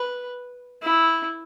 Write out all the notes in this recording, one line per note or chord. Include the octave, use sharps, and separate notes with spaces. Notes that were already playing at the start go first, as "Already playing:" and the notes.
Already playing: B4
E4